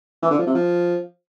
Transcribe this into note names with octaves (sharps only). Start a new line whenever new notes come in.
E3
D3
F3
C3
F3